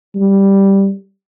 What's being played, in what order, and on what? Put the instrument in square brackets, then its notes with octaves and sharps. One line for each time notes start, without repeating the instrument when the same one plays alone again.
[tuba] G3